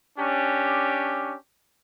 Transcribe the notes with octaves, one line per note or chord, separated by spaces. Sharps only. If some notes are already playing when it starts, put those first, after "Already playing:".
C#4 D4 G4